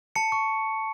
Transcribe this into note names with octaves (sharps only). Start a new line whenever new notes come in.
A5 C#7
C#6